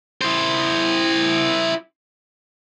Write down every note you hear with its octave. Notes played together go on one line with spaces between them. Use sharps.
E4 C5